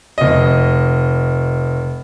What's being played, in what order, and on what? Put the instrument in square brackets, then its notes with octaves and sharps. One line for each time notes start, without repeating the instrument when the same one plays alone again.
[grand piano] F1 D#5